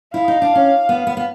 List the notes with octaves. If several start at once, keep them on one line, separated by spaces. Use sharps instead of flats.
E4 F5
D#4
D4
C#4
B3
B3
B3